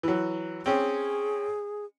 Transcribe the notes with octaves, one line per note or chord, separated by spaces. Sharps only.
E3 F#3
C4 C#4 G#4